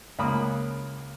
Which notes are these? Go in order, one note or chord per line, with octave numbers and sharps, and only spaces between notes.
C#2 A#3 B5 D#6